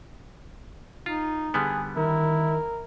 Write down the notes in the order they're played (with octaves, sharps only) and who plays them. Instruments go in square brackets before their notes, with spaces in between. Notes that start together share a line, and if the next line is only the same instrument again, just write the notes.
[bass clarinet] D#4 [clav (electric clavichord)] F4
[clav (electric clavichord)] D3 G3 B3 [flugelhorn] G#4
[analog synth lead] D#3 [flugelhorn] E4 [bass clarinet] A#4